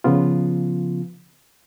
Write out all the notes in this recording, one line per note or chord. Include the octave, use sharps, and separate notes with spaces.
C#3 F3 B3 F4